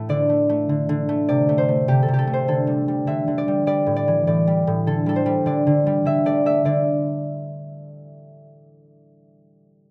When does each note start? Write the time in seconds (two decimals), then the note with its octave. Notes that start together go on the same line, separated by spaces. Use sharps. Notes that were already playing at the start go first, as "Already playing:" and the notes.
Already playing: A2 A3
0.09 D3 D5
0.30 A3
0.49 A3
0.69 D3
0.89 D3
1.09 A3
1.29 C3 D5
1.49 A3
1.58 C5
1.68 A3
1.88 C3 G4
2.03 A4
2.08 C3
2.14 G4
2.19 A4
2.27 A3
2.33 C5
2.48 D3 A4
2.67 G3
2.88 G3
3.07 D3 E5
3.28 D3
3.38 D5
3.48 G3
3.67 G3 D5
3.86 A2
3.96 D5
4.08 E3
4.27 A2 D5
4.47 G3
4.67 A2
4.87 D3 A4
5.06 G3 A4
5.16 C5
5.26 G3
5.46 D3 D5
5.67 D3
5.87 G3
6.05 D3 E5
6.25 A3 D5
6.46 A3 E5
6.65 D3 D5